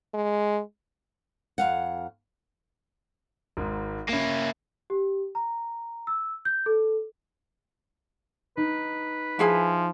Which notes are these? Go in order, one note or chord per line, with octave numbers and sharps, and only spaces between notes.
G#3
F2 F5 F#5
G#1 G#2
A#3 C#4 E4 E7
G4
A#5
E6
G6
A4
D#4 B4
F3 E4 G#4 G#5